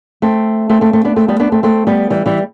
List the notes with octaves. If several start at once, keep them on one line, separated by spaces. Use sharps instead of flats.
A3 C4
A3 C4
A3 C4
A3 C4
B3 D4
A3 C4
G3 B3
B3 D4
A3 C4
A3 C4
G3 B3
E3 G3
E3 G3